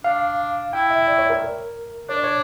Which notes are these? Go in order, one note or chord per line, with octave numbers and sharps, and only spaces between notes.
D4 F5
E4 G5
E5
D5
C#5
A#4
D4 C#5
D5
C#5